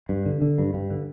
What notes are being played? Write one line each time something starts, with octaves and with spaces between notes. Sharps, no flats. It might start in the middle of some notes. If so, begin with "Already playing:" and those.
G2
D3
D3
G2
G2
D3